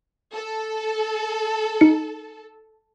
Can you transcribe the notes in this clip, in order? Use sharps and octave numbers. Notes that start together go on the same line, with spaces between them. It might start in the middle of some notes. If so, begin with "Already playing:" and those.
A4
D#4 C#7